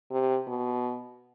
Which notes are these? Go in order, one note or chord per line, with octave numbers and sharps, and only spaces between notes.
C3
B2